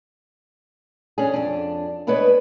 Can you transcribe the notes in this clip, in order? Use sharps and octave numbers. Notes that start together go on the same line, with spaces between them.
C#4 D4 G#4
F2 D4
G#3 B3 D4 B4 C#5 D#5